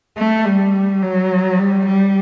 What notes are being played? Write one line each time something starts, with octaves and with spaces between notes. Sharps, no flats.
A3
G3
F#3
G3
G3